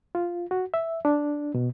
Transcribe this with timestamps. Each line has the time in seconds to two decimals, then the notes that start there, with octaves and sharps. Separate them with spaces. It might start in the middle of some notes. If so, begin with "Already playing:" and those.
0.15 F4
0.51 F#4
0.74 E5
1.05 D4
1.55 B2